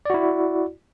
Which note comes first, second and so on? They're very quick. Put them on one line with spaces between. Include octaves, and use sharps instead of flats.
D5 F#4 E4